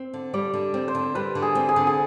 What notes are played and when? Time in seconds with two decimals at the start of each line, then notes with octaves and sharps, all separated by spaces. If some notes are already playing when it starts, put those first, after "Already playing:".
Already playing: C4
0.14 D3
0.33 G3 D5
0.54 D3
0.74 C4
0.88 C5
0.95 D3
1.15 G3 B4
1.35 D3
1.42 G#4
1.55 C4
1.69 G#4
1.76 D3
1.87 G#4